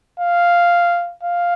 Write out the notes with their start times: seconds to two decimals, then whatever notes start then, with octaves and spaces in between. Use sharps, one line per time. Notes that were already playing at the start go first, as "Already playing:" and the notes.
0.20 F5
1.24 F5